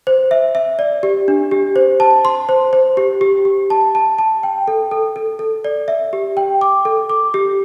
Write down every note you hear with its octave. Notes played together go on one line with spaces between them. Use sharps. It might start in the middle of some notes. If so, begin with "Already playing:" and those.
C5
E5
E5
D5
G4
D4
G4
C5
A5
C6
C5
C5
G4
G4
G4
A5
A5
A5
G5
A4
A4
A4
A4
D5
E5
G4
G5
D6
A4
D6
G4